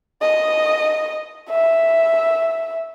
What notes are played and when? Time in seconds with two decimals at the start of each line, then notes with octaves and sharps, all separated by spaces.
0.22 D#5
1.50 E5